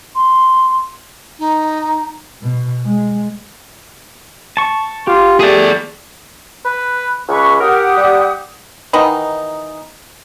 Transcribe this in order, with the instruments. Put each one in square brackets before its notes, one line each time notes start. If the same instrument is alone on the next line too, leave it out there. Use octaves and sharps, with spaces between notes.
[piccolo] C6
[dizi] D#4
[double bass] B2
G#3
[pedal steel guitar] A5 C#6
[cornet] F4 [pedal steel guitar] G4
[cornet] A3 [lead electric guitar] G#4 D5
[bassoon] B4
[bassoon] C#2 [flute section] B4 C#6
[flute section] G4 F#5 D#6 [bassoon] A#4
[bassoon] G3
[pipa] D#3 E3 B3 D#4